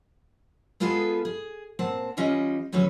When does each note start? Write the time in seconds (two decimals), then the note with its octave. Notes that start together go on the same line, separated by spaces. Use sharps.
0.80 G#3 B3 F4 G#4 A4 B4
1.25 G#4
1.79 A#2 C4 F#5 A5
2.17 E3 G3 C#4 F4 D#5
2.72 D2 E3 F#3 C#4 B4